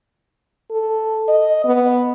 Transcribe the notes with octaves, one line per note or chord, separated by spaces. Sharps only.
A4
D#5
B3